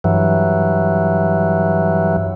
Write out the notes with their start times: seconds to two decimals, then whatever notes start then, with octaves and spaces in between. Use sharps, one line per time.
0.04 G2 E3 F#3